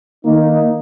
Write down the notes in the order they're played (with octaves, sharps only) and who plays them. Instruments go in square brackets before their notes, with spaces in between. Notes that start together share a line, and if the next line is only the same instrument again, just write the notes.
[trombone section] D#3 A#3 D#4